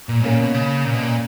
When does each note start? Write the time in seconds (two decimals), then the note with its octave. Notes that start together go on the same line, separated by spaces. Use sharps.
0.09 A#2
0.20 G#2
0.24 A#2 A#3 C#4
0.40 B2
0.54 C#3
0.85 A#2
0.94 B2
1.03 A#2